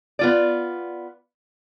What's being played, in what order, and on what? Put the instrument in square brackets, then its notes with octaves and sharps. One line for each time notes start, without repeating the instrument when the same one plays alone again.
[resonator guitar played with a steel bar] B3 F4 D5